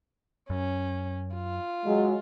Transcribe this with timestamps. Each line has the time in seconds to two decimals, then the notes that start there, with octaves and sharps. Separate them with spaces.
0.50 F#2 C#4
1.35 F4
1.86 F#3 G#3